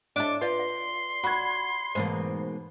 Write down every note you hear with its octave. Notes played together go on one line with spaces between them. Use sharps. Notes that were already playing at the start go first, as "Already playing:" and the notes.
D4 E4 A4 D#5 D6
F4 B4 D5 C6
D5
F#4 B5 G#6
G#2 B2 E3 A3 A#3 C5